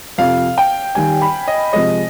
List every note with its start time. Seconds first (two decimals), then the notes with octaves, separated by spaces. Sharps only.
0.18 F2 C3 F3 F5
0.58 G5
0.95 D#2 D#3 G3 G#5
1.22 B5
1.48 D#5
1.73 C3 F3 G#3 D#5